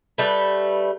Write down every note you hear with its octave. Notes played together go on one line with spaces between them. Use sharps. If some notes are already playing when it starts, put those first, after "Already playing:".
G3 A3 B4